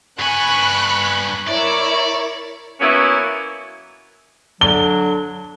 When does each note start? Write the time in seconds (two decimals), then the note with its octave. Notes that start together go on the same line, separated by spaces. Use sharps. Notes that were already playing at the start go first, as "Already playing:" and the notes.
0.19 G2 G#5 B5 C#6 F#6
1.47 E4 A#4 C#5 D5
2.80 F#3 A#3 B3 C#4 E4
4.61 D3 F#3 D4 G7